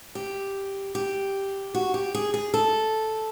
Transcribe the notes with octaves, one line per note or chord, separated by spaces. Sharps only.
G4
G4
F#4
G4
G#4
G#4
A4